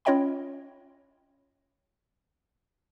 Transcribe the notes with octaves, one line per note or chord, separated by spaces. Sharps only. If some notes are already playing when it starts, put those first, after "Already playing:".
C#4 F4 C#5 D#5 G5 B5